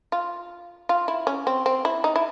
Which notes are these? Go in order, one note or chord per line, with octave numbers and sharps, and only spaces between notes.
F4
F4
E4
C#4
C4
C4
E4
D#4
E4